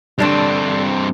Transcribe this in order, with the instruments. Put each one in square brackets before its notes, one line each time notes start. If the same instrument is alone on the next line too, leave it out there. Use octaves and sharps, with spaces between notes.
[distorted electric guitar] G2 C4 [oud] D3 D4 C#5